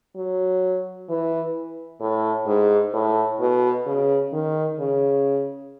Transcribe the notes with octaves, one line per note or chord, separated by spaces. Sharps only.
F#3
E3
A2
G#2
A2
B2
C#3
D#3
C#3